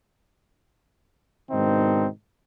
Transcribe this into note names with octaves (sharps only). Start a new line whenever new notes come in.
G#2 B2 D#3 C4 D4 D#4